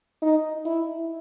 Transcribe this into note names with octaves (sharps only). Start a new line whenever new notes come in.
D#4
E4